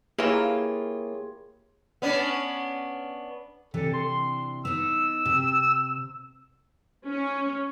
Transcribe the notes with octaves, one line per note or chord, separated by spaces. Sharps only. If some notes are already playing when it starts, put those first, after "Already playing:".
E3 A#3 F4 G4 G#4 C#5
B3 C#4 D4
C3 E3 D4 A4
C6
B3 D#4 E6
C3
C#4